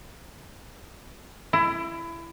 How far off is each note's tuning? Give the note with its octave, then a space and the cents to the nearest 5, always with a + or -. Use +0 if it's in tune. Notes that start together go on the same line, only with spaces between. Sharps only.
E4 +25